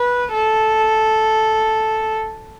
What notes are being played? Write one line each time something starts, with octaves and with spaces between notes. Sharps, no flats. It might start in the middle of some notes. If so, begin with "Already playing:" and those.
Already playing: B4
A4